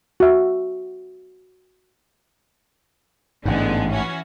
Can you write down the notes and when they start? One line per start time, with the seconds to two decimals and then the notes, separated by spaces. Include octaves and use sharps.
0.20 F#4 E5
3.45 A1 G#2 D3 G#3 B3
3.89 E3 C#4 F#4